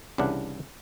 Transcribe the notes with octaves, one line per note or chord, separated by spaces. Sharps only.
C2 C#3 E3 D4 F#5